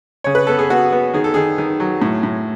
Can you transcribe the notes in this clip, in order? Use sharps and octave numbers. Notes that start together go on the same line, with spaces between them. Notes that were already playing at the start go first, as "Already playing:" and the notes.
C#3 C#5
B4
B3 A4
G#4
B3 F#4
B3
D#3 G#4
A4
D#3 G#4
D#3
F#3
A2
A2